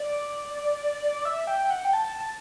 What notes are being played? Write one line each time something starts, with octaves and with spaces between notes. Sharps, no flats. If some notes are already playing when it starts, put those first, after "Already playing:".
Already playing: D5
E5
G5
G5
F#5
G5
A5
A5